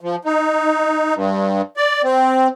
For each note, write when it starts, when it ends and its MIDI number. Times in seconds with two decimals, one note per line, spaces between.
0.01 0.16 53
0.25 1.14 63
1.15 1.62 43
1.77 2.02 74
2.04 2.48 60